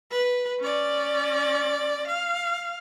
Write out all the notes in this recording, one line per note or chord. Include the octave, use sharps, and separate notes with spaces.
B4
C#4 D5
F5